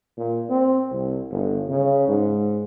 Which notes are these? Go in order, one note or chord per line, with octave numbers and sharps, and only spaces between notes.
A#2
C4
C2
G1
C#3
G#2